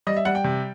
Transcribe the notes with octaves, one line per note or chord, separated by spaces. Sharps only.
G3 D#5
E5
G3 F#5
G5
C3